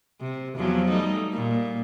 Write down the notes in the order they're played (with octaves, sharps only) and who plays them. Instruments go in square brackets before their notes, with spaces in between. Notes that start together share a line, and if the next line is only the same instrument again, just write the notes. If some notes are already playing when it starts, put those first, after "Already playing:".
[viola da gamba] C3
E2 F3 F#3
G3 A3 D#4
A#2